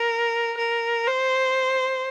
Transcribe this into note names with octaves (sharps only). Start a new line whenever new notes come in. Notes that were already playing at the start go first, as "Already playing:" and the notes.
Already playing: A#4
A#4
C5